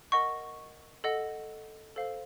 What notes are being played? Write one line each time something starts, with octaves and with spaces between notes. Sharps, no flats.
A#4 D#5 F#5 C#6
A4 D#5 F#5
A4 C5 F5